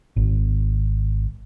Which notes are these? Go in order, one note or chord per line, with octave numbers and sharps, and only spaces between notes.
G#1